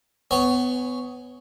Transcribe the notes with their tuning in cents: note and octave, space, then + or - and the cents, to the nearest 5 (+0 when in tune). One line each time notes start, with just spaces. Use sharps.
B3 +25 C#5 +0 G#5 +0